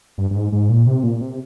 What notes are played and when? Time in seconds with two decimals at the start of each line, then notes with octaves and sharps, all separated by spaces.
0.18 G2
0.30 G2
0.36 G#2
0.52 G#2
0.70 A#2
0.87 C3
1.03 A#2
1.21 C3